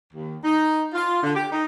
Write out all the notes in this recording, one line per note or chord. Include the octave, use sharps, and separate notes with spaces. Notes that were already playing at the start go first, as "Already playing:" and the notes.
D#2
D#4
F4
D3
G4
D#4